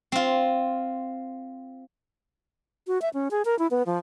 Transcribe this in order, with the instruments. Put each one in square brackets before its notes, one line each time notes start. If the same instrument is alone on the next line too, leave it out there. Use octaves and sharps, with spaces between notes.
[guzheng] C4 F4
[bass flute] F#4
E5
C#4
G#4
A#4
E4
B3
F3